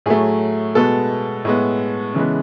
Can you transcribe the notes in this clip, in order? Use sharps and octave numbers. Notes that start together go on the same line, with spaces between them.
A2 F#3 A3 G#4
B2 G#3 B3 A4
A2 G#3 B3
C#3 E3 G#3 B3